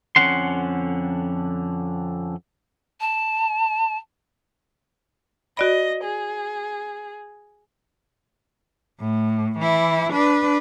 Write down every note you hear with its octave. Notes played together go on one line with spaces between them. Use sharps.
F2 D3 C4 C#4 F#5 C6
A5
F#4 D5 D#5 B5
G#4
A2
E3 E4
D4 B4